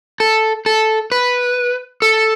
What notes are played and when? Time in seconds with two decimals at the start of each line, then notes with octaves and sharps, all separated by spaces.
0.20 A4
0.66 A4
1.12 B4
2.02 A4